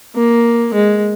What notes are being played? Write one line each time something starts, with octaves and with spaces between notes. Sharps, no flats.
A#3
G#3